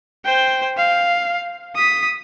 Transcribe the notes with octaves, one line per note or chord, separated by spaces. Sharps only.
C5 G5
F5
D#6 B6